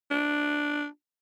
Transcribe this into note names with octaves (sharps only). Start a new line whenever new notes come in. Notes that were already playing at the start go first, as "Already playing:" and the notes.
D4